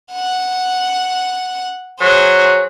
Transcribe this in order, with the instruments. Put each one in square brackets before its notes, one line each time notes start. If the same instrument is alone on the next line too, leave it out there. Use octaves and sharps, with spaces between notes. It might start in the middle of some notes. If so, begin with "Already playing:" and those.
[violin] F#5
[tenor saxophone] F#3 [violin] G#4 C5